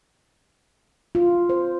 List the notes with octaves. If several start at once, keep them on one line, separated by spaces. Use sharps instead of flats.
F4
C5